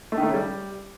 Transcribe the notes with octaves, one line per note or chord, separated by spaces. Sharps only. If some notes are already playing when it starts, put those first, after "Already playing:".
A3
D#3
A3
C#3
G3